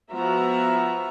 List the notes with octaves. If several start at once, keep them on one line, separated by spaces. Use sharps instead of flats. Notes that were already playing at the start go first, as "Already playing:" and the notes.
F3 B3 F#4 E5 A#5